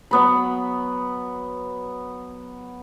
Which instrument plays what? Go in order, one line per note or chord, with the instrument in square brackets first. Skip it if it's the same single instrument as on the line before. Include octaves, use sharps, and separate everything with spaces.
[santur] F#3 B3 B5